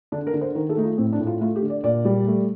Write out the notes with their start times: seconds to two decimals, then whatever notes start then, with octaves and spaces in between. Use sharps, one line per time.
0.12 D3 D4
0.27 A#4
0.34 D3
0.41 C5
0.55 D#3 A#4
0.69 A4
0.77 A3 D#4
0.84 F4
0.98 A2 C4
1.13 D4
1.20 A2
1.27 F4
1.41 A3 F4
1.56 G4
1.62 D3
1.70 D5
1.84 A#2 D5
2.05 G3
2.27 A3